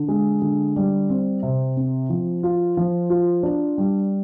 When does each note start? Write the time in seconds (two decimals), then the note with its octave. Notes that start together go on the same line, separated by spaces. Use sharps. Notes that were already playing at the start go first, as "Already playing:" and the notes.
Already playing: D3
0.08 G#3
0.42 D3
0.76 G3
1.10 C4
1.43 C3
1.77 C4
2.10 F3
2.43 F4
2.77 F3
3.10 F4
3.43 D4
3.78 G3